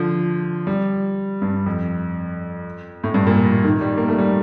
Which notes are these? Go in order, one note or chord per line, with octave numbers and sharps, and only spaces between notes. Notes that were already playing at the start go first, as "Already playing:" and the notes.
Already playing: D3 F3
G3
G2
F2
A2
G2
A#2
D#3
G3
A#3
A3
G3